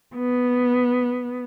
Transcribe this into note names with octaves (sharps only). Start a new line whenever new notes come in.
B3